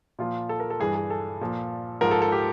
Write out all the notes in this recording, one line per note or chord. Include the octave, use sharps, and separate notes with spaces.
A#2 F3 F4
A4
A#4
A4
G2 E3 G#4
G#4
A4
A#2 F3
G#2 F3 A#4
A4
A4
G4